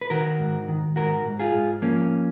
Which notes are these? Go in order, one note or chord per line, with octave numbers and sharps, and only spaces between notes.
B4
D#3 F#4 A#4
G#2
D#3
G#2 F#4 A#4
G#2
F4 G#4
G#2
F3 A#3 C#4